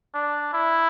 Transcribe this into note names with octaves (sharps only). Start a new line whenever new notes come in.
D4
E4